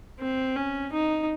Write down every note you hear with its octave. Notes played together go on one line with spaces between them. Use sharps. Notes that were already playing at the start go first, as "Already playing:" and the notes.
C4
C#4
D#4